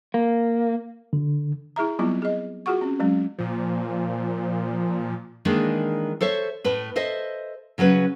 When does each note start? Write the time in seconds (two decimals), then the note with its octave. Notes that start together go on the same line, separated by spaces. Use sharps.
0.14 A#3
1.13 D3
1.76 E4 G#4 E5 A#5
1.99 F#3 G3 B3 C4 E4 F4
2.22 G#4 D#5
2.66 F4 F#4 G#4 F#5 C#6
2.81 C4 C#4
3.00 F#3 G#3 C#4
3.38 A#2 F3
5.45 D#3 E3 G#3 A#3 D4
6.21 A4 C5 C#5 E5
6.64 A2 A3 B4
6.96 A4 C5 D#5 E5
7.78 C#3 F#3 C#4 B4